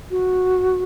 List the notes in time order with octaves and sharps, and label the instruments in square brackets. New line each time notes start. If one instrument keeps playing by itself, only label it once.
[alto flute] F#4